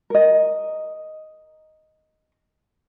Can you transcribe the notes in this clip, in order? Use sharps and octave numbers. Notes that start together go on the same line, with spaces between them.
A#4 D#5